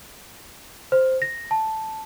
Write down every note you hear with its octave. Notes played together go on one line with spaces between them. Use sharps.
C5
A#6
A5